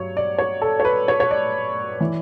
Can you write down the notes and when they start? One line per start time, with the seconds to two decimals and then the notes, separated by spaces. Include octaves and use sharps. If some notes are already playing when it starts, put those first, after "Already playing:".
Already playing: G2 F#3 C#5
0.17 D5
0.39 C#5
0.62 A4
0.80 C#5
0.85 B4
1.08 C#5
1.20 C#5
1.31 D5
2.00 E3